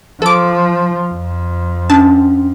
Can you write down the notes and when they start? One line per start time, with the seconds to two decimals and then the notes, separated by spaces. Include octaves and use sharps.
0.22 F3 A4 D6
1.12 F2
1.90 C#4 D4 A5